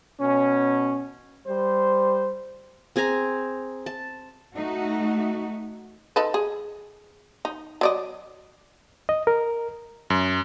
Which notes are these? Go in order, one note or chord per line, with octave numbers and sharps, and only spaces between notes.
B2 C#4
G3 C5
C4 G#4 G#5 A#5
A5
A3 D#4 F#4
D#4 A4 B4
G#4
D#4
F#3 D5 D#5
D#5
A#4
F#2